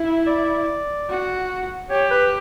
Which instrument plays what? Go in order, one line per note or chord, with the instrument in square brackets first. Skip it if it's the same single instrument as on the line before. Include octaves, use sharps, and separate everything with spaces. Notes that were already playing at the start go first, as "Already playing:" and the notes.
Already playing: [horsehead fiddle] E4
[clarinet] D5
[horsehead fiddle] F#4
[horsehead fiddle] G4 [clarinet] C#5
[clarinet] B4